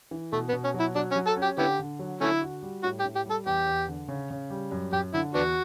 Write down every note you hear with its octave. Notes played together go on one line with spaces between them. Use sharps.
E3
B2 A3
B3
B2
C#4
F#3
E4
F#3 D4
C#4
F#3
A4
C#4
G4
D3 B3 E4 G4
D3
F#3
D3 A3 C#4 E4
F#4
G3
A2 F#4
G4
A2
G4
G3 A4
E2 G4
E2
D3
C#3
C#3
G3
F#2
F#2 G4
D3 E4
E2 B3 D4 F#4